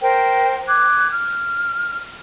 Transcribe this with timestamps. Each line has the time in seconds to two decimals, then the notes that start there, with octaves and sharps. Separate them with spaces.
0.01 A#4 C5 G5
0.67 D6 F#6 G#6
1.10 F6